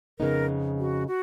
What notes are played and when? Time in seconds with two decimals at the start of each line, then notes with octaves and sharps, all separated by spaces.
0.19 F2 C#3 G#3 B3 D#4 A#4
0.79 F#4
1.08 F#4